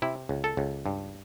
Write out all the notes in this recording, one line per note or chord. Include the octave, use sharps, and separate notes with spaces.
C3 E4
C#2
A4
C#2
G2